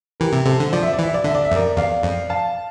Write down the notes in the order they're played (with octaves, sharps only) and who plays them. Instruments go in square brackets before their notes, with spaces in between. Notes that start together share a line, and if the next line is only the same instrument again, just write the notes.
[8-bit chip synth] E3 [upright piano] G4 A#4
[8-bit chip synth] C3
[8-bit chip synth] C3 [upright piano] A4 C5
[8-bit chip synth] D3
[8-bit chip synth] F3 [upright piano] D5
[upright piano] E5
D5
[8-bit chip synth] E3 [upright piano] E5
[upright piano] D5
[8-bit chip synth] D3 [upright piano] E5
[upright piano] D5
E5
[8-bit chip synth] F2 [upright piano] A#4 D5
[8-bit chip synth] E2 [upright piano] D5 F5
[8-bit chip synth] F2
[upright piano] F5 A5